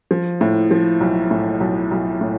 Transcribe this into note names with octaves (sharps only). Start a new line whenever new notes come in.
F3
A2
F3
B1
A2
B1
B1
A2